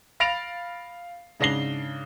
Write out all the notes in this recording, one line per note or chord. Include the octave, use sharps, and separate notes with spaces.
F5 B5 A6 A#6 D7 F7
G#2 C#3 D4 A#6 C7 G7